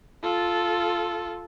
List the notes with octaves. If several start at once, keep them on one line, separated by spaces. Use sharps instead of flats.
F4 A4